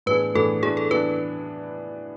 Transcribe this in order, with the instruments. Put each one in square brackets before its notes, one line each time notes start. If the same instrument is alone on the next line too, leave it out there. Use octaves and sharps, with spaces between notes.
[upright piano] A2 E3 B3 D4 G#4 [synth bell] B4
[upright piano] A2 E3 B3 D4 G#4 [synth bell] A4
[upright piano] E3 B3 D4 [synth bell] G#4
[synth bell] A4
[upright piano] E3 B3 D4 [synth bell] B4